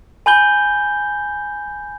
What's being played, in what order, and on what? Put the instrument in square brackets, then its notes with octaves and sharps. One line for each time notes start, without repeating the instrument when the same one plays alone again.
[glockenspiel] G#5 B5 G6 G7